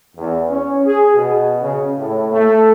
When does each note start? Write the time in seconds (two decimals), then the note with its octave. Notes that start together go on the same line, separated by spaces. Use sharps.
0.17 E2
0.50 C#4
0.85 G#4
1.15 B2
1.62 C#3
1.98 A2
2.32 A3